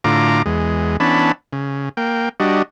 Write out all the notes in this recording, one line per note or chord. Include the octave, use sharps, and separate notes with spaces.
A2 D3 F4 A#5 D6
E2 G#3
E3 B3 C#4 D4 A5 B5
C#3
A#3 G5
G3 D4 F#4 D#5